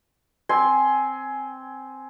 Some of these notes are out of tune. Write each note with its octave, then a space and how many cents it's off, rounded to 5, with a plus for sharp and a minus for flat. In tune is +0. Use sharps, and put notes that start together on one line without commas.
C4 +0 G#5 +15 C6 +0